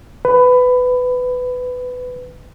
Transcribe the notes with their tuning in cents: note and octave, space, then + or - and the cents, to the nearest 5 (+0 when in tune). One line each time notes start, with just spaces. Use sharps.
B4 +15